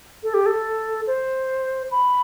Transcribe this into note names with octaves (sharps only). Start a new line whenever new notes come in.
A4
G4
A4
C5
B5